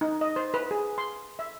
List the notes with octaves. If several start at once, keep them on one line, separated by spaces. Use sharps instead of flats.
D#4
D#5
C5
B4
G#4
C6
E5